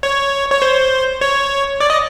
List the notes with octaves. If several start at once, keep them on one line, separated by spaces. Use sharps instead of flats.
C#5
C#5
C5
C#5
D5
D#5